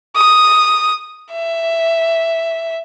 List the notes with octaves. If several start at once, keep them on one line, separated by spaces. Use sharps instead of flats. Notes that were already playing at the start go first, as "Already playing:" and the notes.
D#6
E5